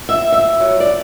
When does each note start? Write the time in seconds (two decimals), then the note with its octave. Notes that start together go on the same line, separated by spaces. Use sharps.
0.09 E5
0.32 E5
0.60 F#3
0.80 D5